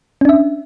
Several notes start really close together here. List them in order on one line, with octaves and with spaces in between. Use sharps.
C#4 D4 E5